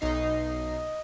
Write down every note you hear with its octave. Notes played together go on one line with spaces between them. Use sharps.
B1 D#4 D#5 C7